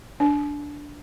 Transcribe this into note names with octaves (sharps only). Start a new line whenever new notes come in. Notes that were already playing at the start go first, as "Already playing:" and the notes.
D4